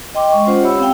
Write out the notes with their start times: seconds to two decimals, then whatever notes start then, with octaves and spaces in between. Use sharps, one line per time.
0.14 D#5 G5 C6 D6
0.32 G#3 C#6
0.47 C#4 F4 C5 F#5
0.63 G4 C#5 E5 B5 E6
0.79 C4 F5 G5